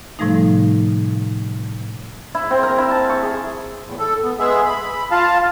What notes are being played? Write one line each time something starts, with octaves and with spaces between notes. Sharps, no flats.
A2 C3 F3 G3 A3 D#4
E4
C4
A#4
E4
A5
C#6
G#4
E2 A2
A4
B3
G#3 B3 G#4 E5
B5
F4 F5 A5